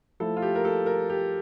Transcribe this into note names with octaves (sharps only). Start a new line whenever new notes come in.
F3 A3 E4 A4
F4
G4
A#4
A4
A#4
G4